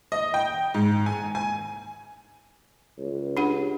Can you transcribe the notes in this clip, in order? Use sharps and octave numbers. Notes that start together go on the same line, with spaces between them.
D#5
G5
G#2
G#5
G#5
C#2
D4 G4 F#5